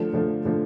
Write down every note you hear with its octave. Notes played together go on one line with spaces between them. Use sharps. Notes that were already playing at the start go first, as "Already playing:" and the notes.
Already playing: D3 F3 A3
D3 F3 A3
D3 F3 A3